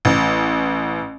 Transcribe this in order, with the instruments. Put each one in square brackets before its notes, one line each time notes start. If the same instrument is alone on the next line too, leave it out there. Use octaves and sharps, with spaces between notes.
[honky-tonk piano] A1